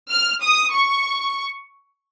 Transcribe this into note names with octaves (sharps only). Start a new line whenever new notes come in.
F6
D#6
C#6